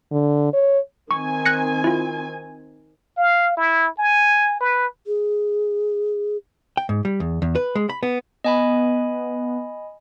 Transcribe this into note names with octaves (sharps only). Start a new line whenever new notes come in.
D3
C#5
D#3 C4 G#5 C#6
F#6 A#6 C#7
E4 F4
F5
E4
G#5
B4
G#4
G5
G#2
G3
E2
E2
B4
G#3
B5
B3
B3 D#5 G#5 B5